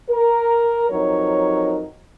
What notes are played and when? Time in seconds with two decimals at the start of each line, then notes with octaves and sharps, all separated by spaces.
0.10 A#4
0.90 F2 F#3 D#4 A#4 C#5